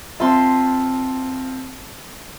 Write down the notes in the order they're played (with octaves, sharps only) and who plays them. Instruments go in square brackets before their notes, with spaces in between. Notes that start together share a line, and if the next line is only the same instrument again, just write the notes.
[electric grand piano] C4 F4 [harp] E5 A5 C6